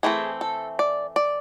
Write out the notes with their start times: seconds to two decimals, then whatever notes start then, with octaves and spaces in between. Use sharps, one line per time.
0.03 E3 A3 C4 G#4
0.41 A4
0.79 D5
1.16 D5